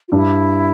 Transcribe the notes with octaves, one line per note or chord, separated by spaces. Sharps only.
F4
G2 E4